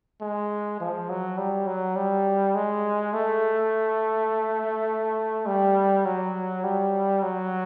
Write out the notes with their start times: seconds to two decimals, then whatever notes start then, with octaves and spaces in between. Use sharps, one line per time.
0.21 G#3
0.80 F3
1.09 F#3
1.37 G3
1.67 F#3
1.96 G3
2.55 G#3
3.13 A3
5.46 G3
6.05 F#3
6.64 G3
7.23 F#3